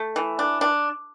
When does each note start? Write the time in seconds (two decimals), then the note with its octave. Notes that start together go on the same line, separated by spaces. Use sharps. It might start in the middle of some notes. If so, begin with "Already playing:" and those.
Already playing: A3
0.16 E3
0.39 D4
0.61 D4